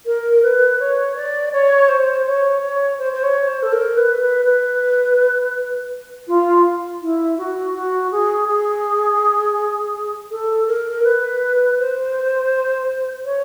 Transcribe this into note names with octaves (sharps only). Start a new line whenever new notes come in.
A#4
B4
C#5
D5
C#5
C5
C#5
C#5
C5
C5
C#5
C5
A4
A#4
B4
B4
B4
F4
E4
F#4
F#4
G#4
G#4
A4
A#4
B4
C5
C#5